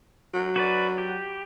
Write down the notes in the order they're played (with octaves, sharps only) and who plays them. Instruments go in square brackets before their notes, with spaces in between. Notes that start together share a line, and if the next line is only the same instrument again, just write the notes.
[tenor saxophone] F#3
[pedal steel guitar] F#4 B4 D5
G4